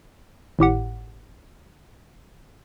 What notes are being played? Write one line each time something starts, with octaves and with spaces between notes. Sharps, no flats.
G#1 A2 G4 F#5